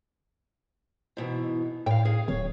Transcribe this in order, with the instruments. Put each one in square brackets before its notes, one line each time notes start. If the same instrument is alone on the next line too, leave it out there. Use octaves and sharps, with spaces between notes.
[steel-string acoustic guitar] G#2 B2 E3
[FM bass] A2 [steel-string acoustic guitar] F5 G5
[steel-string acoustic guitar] G#4 F5
[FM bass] D1 [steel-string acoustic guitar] C#5